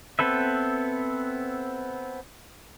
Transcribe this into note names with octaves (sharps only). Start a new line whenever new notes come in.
B3 C4 A4 B4 E5